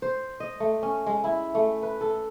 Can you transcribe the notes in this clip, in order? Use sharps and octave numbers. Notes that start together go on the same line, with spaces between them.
C5
D#5
A3
C#4
G#3
E4
A3
B4
A4